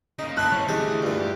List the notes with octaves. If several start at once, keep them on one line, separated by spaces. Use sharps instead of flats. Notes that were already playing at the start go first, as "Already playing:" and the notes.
C#3 A#3 D#4
E4 E5 A5 C6 F#6
G3 C#4 C5 C#5
D2 E3 G#3 A3 E4 G4 C5
G2 E3 F4 D5
G4